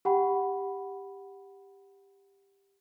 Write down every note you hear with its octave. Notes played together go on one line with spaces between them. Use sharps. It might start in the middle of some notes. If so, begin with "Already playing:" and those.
G4 F#5 G5 B5